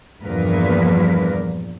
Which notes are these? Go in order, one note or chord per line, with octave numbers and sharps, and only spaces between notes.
E2 G2 A#2 F3 A#4 B4